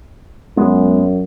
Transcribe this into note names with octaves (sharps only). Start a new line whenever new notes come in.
F#2 G#3 B3